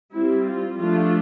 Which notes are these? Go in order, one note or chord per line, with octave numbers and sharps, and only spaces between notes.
G3 C4 E4
F4
F3 A3 D4 F4